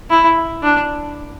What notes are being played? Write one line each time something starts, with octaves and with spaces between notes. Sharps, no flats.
E4
D4